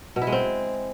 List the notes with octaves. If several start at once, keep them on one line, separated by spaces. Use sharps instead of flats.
B2
E4
G#3
C4